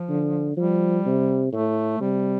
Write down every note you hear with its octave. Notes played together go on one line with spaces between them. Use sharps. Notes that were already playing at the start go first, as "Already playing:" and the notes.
Already playing: F3
D3
F3 G3
C3
A2 A3
C3 G3